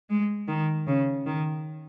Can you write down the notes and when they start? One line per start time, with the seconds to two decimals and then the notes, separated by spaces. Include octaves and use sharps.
0.10 G#3
0.49 D#3
0.87 C#3
1.26 D#3